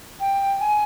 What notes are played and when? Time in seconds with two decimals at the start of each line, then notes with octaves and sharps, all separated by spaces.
0.20 G5
0.60 G#5